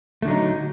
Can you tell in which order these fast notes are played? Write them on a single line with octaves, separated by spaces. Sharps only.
A3 D3 F#3 D#4